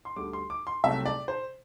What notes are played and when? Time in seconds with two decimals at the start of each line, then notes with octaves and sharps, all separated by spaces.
0.05 C6
0.16 D2 D3 G3 D6
0.33 C6
0.50 D6
0.67 C6
0.83 C2 C3 F#3 A3 E5
1.06 D5
1.28 C5